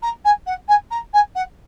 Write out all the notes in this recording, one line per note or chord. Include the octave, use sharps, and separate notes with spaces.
A#5
G#5
F#5
G#5
A#5
G#5
F#5